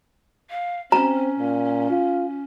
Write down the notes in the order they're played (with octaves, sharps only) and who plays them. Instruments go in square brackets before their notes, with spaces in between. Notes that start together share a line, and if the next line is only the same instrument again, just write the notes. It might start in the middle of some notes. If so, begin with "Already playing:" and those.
[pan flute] F5
[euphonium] C4 [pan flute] C#4 [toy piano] A#5
[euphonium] A#2
F4